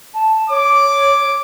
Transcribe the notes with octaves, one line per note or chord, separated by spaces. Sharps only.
A5
C#5 D6